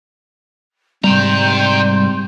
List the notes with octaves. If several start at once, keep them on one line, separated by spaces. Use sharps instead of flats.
G#2 C3 G3 G5 A#5 C6 G6